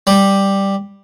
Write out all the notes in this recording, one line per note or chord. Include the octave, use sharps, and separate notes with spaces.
G3